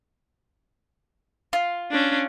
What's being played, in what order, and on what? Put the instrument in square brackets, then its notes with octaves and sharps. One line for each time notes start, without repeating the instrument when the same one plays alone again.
[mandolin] F4
[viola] C#4 D4